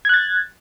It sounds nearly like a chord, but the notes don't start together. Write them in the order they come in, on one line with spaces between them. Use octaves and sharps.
G#6 F#6 A6